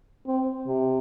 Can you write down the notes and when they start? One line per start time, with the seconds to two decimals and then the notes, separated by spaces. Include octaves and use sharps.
0.26 C4
0.67 C3